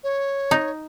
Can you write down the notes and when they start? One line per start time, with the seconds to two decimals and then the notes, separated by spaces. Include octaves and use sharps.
0.04 C#5
0.51 D#4